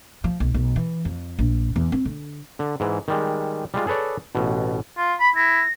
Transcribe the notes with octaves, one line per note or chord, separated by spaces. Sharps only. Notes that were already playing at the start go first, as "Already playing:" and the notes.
F3
B1
B1
E3
F2
A#1
E2
C4
D3
D3
G#2 E3
D#3 G3 G#3
G3 G#3 F4
G#4 A4 B4 C#5 D5
A1 B2
F4
B5
E4 A#6